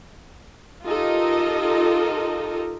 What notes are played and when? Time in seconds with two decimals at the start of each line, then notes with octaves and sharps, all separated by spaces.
0.85 D#4 F4 G4 A4 A#4 D#5